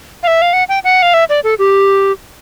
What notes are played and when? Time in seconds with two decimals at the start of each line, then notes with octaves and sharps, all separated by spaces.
0.23 F5
0.27 E5
0.42 F5
0.53 F#5
0.69 G5
0.84 F#5
1.02 F5
1.14 E5
1.29 D5
1.44 A4
1.59 G4